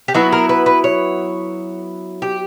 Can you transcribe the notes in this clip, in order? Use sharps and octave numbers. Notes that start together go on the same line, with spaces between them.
G4
F#3 B3 E4 F#4
A#4
B4
B4
C#5
G4